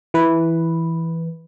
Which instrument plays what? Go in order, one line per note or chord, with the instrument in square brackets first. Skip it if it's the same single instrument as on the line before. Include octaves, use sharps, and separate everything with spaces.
[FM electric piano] E3 B4